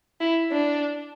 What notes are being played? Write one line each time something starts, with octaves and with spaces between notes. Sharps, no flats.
E4
D4